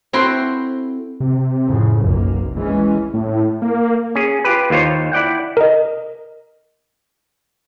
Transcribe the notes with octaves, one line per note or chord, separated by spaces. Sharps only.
C4 E4 F#4 A4 G5 C6
C3
F2 A2 C#3
F1 B1 F#2 A#3
E3 G#3 C#4
A2
A#3
C#4 G#4
F4 G4 B4
D#2 A#3 F4 C5 C#5
E4 D5 F#5 G5
A#4 D#5